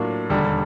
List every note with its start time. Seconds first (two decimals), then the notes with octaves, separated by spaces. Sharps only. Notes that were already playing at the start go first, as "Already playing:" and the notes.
Already playing: A2 F#3 A#3 D4 F4
0.30 E1 D#2 D3 G3